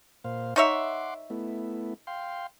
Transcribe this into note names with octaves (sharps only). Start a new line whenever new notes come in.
A#2 C5 F5
D#4 C#5 E5 F#5 C6 D6
A3 B3 E4
F5 G5 C6